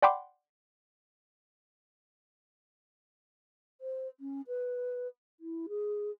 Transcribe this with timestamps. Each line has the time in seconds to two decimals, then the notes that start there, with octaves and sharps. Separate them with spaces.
0.02 D5 F#5 G5 B5 C6 D6
3.81 C5
4.20 C#4
4.47 B4
5.40 E4
5.68 G#4